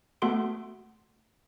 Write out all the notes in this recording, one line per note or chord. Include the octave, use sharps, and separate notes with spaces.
A3 B3 F#4 A4 C6 D7